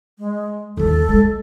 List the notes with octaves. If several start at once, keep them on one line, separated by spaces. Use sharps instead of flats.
G#3
D#2 F3 A4
G#3